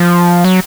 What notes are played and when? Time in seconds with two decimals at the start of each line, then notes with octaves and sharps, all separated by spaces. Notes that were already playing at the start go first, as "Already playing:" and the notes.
Already playing: F3
0.45 F#3